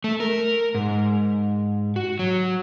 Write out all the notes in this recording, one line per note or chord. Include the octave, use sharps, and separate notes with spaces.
A3
A#4
G#2
F#4
F#3